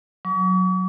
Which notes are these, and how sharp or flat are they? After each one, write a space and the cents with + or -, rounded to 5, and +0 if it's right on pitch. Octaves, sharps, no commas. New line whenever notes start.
F#3 -5 C#6 +45